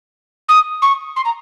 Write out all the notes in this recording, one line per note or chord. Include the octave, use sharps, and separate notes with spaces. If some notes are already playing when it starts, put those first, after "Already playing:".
D#6
C#6
C6
A#5